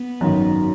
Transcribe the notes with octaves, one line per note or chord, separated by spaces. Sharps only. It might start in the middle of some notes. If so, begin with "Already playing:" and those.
Already playing: B3
G#1 F#2 D#3